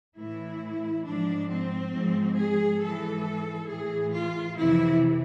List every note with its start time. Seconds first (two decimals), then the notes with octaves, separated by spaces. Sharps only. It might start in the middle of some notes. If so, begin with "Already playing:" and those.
0.15 A2 E3 E4
1.04 G#2 F3 D4
1.48 C4
1.91 G#2 F3
2.35 G#4
2.79 G#2 E3 A4
3.66 A2 E3 G#4
4.11 F4
4.55 F2 C3 E3 E4